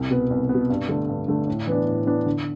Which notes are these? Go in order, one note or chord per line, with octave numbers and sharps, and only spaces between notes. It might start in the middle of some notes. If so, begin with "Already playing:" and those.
Already playing: C2
B2 B3
C2
B3
B2
G2
D3 A3
G2
D3 A3
A2
E3 B3 D4
A2
E3 B3 D4
D3